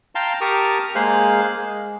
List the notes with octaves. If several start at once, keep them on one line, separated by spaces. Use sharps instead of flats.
F5 G5 A5 A#5 C6
G4 A#4 A5 C#6 D#6 F6
G#3 A#3 G#4 C5 F5 F#6
G#3